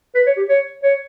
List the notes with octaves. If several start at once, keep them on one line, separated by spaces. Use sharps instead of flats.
B4
C#5
G4
C#5
C#5